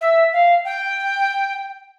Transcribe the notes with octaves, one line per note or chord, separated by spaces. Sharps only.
E5
F5
G5